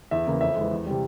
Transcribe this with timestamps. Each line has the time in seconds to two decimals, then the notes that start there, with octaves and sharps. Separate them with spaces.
0.11 E2 E5
0.27 C#3 E3 A#3
0.41 F2 E5
0.56 E3 G#3
0.71 E2
0.86 C3 G3